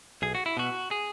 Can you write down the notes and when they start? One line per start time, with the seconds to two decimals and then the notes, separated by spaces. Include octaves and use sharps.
0.22 B1 G#4
0.35 F#4
0.46 E4
0.57 B2 F#4
0.91 G#4